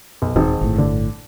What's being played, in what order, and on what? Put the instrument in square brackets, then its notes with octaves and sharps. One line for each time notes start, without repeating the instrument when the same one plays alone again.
[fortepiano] B1
[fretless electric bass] D#1 [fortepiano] G#1 D#4
[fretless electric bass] G1 A2
[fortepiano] D3